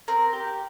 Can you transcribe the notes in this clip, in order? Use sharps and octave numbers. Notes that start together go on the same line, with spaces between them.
C4 A#4
G4